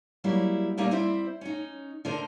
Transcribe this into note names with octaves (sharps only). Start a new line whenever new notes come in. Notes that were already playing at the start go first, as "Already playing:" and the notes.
F#3 G3 A#3 E4
A#2 G3 A#3 D#4 E5
G3 C4 E4 C5 E5
C#4 D#4
D3 A3 A#4 C5